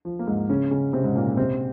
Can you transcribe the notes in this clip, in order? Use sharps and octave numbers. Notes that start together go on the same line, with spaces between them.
F3
A#3
G#2 G#3
C#3 C#4
C#3 C#4
C3 C4
G#2 G#3
A#2 A#3
C3 C4